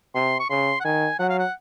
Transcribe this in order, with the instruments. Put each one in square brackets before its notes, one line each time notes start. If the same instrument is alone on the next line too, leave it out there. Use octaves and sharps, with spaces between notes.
[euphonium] C3 [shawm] C6
[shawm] C#6
[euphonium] C#3 [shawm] C6
[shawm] F#5
[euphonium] D#3 [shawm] G#5
[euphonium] F#3 [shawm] F#5
[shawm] F5
F#5